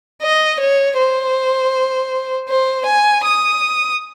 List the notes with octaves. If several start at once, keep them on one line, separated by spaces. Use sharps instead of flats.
D#5
C#5
C5
C5
G#5
D#6